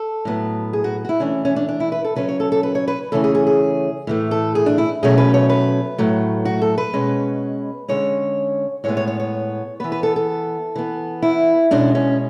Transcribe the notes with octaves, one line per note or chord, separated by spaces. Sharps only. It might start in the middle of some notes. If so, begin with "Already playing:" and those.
Already playing: A4
A2 F#3 B3
G#4
F#4
F#4
E4
E3 A3 C#4 D4
C#4
D4
D4
E4
B4
A4
C#3 F#3 C#4 B4
C#5
A4
A4
B4
C#5
B4
C#3 E3 A3 C#4 A4
G#4
G#4
G#4
A2 E3 A3
A4
G#4
D4
E4
B2 F#3 A3 C#4 G#4
B4
C#5
B4
A2 F#3 A3
F#4
A4
B4
B2 G#3 C#4
D3 G#3 C#4 C#5
A2 G#3 B3 C#5
C#5
C#5
C#5
E3 B3 B4
B4
A4
A4
E3 B3
E4
B2 G#3 C#4 D4
C#4